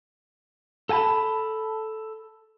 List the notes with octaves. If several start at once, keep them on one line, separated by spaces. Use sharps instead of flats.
A4 F#5 G#5 A5 B5